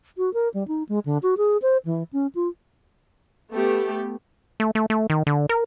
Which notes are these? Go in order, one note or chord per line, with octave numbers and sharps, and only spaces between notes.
F#4
A#4
G3
D#4
G#3
D3
F#4
G#4
C5
E3
C#4
F4
A3 B3 G4
A3
A3
A3
D#3
D3
A#4